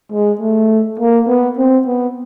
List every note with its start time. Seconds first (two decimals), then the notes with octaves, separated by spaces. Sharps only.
0.12 G#3
0.41 A3
0.99 A#3
1.28 B3
1.58 C4
1.87 B3